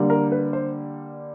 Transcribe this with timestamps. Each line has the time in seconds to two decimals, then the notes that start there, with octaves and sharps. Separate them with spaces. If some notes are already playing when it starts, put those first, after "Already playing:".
Already playing: D3 G3 A#3
0.10 A#4
0.32 B4
0.53 C5